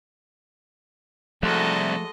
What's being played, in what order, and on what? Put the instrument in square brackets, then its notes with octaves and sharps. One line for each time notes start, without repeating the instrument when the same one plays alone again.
[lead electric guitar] C2 [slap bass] F3 A3 [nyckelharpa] G#3 D#5 [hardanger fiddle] F#4 A4